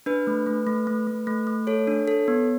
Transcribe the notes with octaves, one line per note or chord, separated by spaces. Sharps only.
D4 B4
A3
A3
A3
A3
A3
A3
A3
A4 C#5
D4
A4
B3